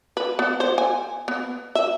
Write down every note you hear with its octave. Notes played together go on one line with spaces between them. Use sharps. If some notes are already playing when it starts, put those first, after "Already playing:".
B4
B3
C5
G#5
B3
E5